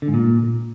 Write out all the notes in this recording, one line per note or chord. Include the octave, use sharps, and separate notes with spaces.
D3
G#2
A#2